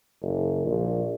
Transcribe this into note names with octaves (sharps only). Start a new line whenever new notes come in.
F#1
A#1